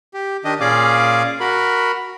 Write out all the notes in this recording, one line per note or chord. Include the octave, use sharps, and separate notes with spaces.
G4
D#3 D4 G4 D#5
A#2 C#4 G#4 D5 F5 D6
F#4 A#4 B5